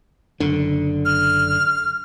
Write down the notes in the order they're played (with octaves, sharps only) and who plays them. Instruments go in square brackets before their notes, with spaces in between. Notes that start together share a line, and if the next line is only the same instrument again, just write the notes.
[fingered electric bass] F#1 D3
[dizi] F6